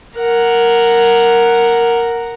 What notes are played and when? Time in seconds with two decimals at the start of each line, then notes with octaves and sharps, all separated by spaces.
0.17 A#4 F#5